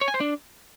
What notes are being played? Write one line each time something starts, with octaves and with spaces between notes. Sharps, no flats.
C#5
G#5
C5
D4